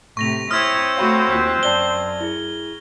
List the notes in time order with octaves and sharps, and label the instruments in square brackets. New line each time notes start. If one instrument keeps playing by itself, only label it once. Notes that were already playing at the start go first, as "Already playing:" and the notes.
[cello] A2 C3 [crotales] C#6 A#6 F7
[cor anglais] C4 [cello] E4 C#5 [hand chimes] D#6 [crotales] F6 G#6
[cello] A3 F#4 [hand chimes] C#5 F5 B5
[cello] D#2 [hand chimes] F4 F#6 B6
[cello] F#2 [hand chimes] C5 D5 A5 [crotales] G7
[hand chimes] E4 G#4